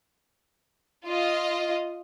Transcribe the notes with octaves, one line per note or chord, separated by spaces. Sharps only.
F4 D#5